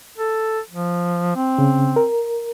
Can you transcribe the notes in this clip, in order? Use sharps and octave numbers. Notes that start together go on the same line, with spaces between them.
A4
F3
C4
C#3
A#4